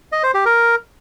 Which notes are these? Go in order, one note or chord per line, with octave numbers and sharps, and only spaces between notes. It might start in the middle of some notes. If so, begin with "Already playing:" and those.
D#5
C5
G4
A#4